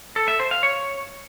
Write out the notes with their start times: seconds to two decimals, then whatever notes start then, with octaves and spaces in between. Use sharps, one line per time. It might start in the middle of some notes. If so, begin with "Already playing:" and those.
0.16 A4
0.28 E5
0.40 C5
0.51 F5
0.63 C#5